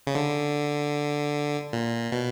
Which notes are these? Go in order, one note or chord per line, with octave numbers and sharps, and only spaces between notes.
C#3
D3
A#2
B2